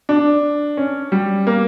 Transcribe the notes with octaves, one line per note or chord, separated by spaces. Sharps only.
D4
C#4
G3
A#3